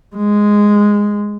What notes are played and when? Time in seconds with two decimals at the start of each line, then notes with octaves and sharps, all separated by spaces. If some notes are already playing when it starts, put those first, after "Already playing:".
0.16 G#3